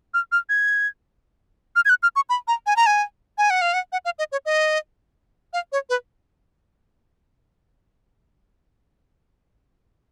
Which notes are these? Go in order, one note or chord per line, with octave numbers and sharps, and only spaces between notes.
F6
F6
G#6
F6
G#6
F#6
F6
C#6
B5
A#5
G#5
A#5
G#5
G#5
F#5
F5
F#5
F#5
F5
D#5
C#5
D#5
F5
C#5
B4